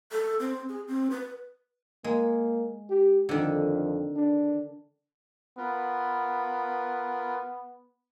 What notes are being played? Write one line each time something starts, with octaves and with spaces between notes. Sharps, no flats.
A4
C4
G#4
C4
B4
G#3 A#3
G4
F2 D3 D#3
D4
B3 F4 A#4 B4